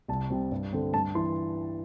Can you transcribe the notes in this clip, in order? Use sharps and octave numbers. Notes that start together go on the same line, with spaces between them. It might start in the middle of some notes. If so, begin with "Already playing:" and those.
C2 A5
C3 G3 C4
G2
D3 C4
G2 A5
E3 C6